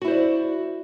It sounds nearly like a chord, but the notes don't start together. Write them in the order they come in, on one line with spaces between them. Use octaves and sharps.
F#4 E4 C5 D5